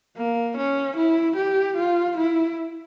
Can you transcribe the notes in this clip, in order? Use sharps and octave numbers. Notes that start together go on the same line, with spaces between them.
A#3
C#4
E4
G4
F4
E4